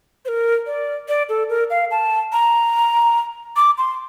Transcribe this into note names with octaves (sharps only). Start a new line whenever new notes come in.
C5
A#4
D5
D5
A4
A#4
F5
A5
A#5
D6
C6